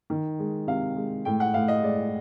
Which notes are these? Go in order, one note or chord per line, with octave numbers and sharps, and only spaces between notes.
D#3
G#3
C3 F5
G#3
A2 G5
F#5
A2 F5
D#5
G#3 D5